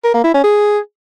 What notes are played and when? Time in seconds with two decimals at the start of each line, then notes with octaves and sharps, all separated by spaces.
0.04 A#4
0.14 A#3
0.24 E4
0.34 C#4
0.44 G#4